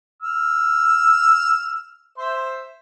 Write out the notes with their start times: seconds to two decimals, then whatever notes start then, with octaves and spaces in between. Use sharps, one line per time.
0.22 E6 F6
2.18 C5 E5 C6